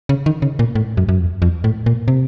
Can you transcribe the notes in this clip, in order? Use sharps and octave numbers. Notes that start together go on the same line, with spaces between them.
C#3
D#3
C#3
A#2
A2
F#2
F#2
F2
F2
A2
A#2
C3